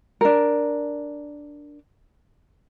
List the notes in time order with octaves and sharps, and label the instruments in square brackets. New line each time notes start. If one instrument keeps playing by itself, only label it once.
[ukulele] D4 A#4